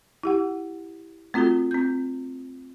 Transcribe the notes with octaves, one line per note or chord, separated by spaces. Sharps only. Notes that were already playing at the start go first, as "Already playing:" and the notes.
E4 G4 F#5
A3 C4 F4 F#4 A4
C4 G6